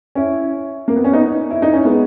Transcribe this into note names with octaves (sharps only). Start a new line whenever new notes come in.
C#4 E4
A#3
B3
C#4
B3 D#4
E4
D#4
C#4
G#3 B3